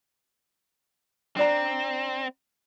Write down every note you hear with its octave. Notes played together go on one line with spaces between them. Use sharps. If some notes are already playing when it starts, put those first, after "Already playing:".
C4 D4 D5 A#5